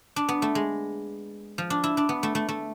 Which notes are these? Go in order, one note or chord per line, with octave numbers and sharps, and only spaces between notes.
D4
B3
A3
G#3
F3
D4
E4
D4
B3
A3
A3
A3